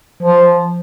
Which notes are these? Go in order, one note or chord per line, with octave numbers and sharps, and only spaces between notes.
F3